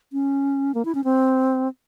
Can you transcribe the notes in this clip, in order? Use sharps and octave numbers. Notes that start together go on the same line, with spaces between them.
C#4
A#3
E4
C#4
C4